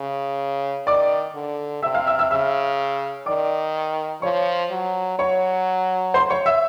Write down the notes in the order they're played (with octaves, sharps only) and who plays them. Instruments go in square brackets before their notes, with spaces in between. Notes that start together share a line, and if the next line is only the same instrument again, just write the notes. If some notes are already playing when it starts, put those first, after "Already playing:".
Already playing: [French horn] C#3
[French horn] D#3 [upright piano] D5 D6
[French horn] D3
[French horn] C3 [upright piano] E5 E6
[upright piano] F5 F6
E5 E6
E5 E6
[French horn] C#3 [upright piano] E5 E6
[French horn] D#3 [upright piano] D5 D6
[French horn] F3 [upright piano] C#5 C#6
[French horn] F#3
[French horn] F#3 [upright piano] C#5 C#6
[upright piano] C5 C6
C#5 C#6
E5 E6